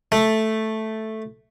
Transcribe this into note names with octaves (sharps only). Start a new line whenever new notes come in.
A3